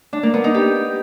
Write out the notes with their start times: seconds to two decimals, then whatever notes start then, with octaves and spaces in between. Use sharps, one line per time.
0.13 D4
0.23 A#3
0.34 B3
0.44 D#4
0.54 G4